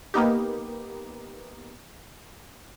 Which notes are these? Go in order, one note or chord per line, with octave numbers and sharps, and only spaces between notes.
A#3 B3 D#4 G4